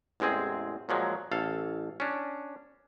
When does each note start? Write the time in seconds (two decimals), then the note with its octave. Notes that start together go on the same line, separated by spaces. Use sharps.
0.20 A1 E2 G#3 C4 G#4
0.89 A#2 F3 F#3 G#3
1.31 A1 A4 F5
2.00 C#4 D4